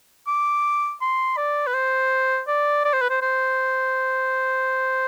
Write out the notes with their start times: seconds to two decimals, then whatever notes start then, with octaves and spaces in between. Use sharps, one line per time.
0.27 D6
1.01 C6
1.37 D5
1.67 B4
1.74 C5
2.47 D5
2.84 D5
2.93 C5
3.01 B4
3.10 C5
3.22 C5